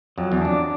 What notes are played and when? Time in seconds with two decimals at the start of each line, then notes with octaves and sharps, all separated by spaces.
0.18 F2 F#3
0.32 E2
0.41 F2 D4